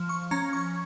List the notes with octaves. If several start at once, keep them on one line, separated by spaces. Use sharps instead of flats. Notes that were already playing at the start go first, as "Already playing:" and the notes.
Already playing: F3
C#6
C#4 A#5
C#6